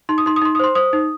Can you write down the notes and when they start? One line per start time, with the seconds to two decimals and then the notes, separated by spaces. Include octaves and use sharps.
0.09 D#4 C6
0.18 D#6
0.26 D#4 C6
0.36 D#6
0.42 D#4 C6
0.55 D#6
0.59 C5 C6
0.75 C5 D#6
0.93 D#4